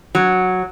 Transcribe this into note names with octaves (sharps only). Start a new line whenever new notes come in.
F#3